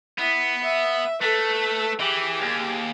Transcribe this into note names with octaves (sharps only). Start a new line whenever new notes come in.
B3 E4
E5
A3 A4 B4
E3 G4 G#4
D#2